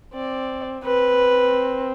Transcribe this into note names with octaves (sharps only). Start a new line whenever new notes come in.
C4 D5
C4 B4